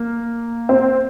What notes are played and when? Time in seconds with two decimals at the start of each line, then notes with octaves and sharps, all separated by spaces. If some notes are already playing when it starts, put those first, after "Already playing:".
Already playing: A#3
0.69 C4